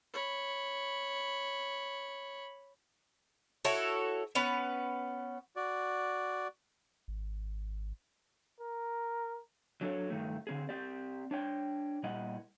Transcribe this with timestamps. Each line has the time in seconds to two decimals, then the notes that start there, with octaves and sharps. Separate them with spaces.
0.14 C#5 B5
3.65 E4 F#4 A4 C#5
4.35 B3 C#4 B4
5.56 F#4 D5
7.08 G#1
8.60 A#4
9.81 F#3 D4 A4 C#5
10.10 G2 D#3 A3
10.47 D3 C4 G#4
10.69 C4 G4 D5
11.31 D4 C#5 G5
12.03 A#2 G3 E4 D#5 F#5